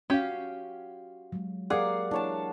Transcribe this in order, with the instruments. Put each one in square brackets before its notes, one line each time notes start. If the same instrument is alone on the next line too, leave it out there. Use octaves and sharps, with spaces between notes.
[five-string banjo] C#4 G4 [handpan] F#4 F5
[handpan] F#3 G#3
[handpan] G4 A#4 [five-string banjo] G#4 [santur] D5 F5 F#5
[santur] D4 C#5 A5 [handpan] E4